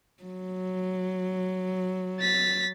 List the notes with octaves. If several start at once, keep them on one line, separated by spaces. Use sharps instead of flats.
F#3
A6 B6